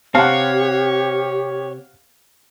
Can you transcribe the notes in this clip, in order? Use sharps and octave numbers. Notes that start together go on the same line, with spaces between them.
C3 C4 G4 C#5 F5 F#5